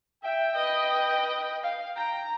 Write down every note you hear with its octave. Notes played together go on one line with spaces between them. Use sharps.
E5 G5
B4 D#5
F5
G5 A#5